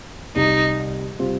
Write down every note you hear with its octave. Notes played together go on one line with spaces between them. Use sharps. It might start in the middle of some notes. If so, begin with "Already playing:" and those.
C2 C3 G3 D#4
C3 G3 C4 F4